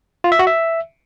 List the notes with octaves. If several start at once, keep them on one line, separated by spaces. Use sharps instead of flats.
F4
E5
F#4
E5